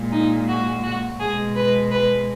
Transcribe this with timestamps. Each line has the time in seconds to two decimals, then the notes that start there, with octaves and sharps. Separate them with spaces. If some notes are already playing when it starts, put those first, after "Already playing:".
Already playing: A#2 G#3
0.12 D#4
0.48 F#4
0.83 F#4
1.19 B2 G#3 G#4
1.55 B4
1.91 B4